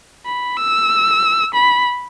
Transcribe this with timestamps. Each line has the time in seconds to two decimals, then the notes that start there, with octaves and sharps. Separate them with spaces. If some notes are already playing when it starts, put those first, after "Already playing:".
0.26 B5
0.57 E6
1.54 B5